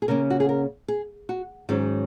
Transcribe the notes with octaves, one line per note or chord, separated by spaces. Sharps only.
G#4
C#3 A#3 C#4 A#4
F#4
G#4
A#4
G#4
F#4
G#2 D#3 F#3 C#4 G#4